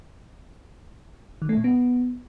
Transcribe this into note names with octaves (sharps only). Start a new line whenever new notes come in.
D#3
A3
A#2
B3